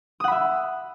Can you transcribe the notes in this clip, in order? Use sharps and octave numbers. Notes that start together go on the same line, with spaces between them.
E5 F#5 B5 D#6